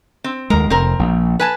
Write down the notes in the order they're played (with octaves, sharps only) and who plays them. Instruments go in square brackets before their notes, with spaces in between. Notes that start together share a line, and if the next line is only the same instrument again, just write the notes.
[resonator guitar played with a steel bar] C4
[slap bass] D#2 G#3 [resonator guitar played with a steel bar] A#4
[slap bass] F1 [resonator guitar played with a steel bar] C4 A#4
[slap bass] A#1
[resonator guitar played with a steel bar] B4 G#5 A5